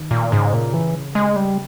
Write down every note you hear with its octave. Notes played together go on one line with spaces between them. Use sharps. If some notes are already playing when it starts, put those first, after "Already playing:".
Already playing: D#3
A#2
G#2 C#3
A#2
E3
G#3
G3